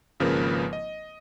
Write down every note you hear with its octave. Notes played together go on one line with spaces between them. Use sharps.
G#1 C#3 F3 A#3 A#4 B4
D#5